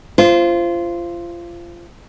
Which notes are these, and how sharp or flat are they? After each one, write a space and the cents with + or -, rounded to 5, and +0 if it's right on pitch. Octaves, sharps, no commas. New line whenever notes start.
F4 -25 C5 +0